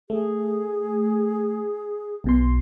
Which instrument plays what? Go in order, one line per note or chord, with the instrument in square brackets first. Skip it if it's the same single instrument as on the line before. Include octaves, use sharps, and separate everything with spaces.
[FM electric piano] A3 [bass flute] G#4
[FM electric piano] B1 B2 C6